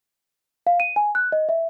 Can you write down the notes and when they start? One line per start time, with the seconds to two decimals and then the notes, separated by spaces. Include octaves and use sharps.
0.67 F5
0.80 D#7
0.96 G#5
1.15 F#6
1.32 D#5
1.49 E5